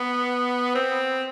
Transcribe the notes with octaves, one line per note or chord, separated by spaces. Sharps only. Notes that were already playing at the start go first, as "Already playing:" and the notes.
Already playing: B3
C4